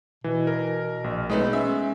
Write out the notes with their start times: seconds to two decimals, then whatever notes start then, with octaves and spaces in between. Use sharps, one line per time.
0.24 B2 E3
0.47 A#4
1.04 A#1
1.30 G#3 A3 B3 D#4
1.53 C#4 E5